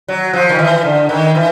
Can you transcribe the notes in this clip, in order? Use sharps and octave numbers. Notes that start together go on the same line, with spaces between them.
F#3
F3
D#3
E3
D3
D#3
E3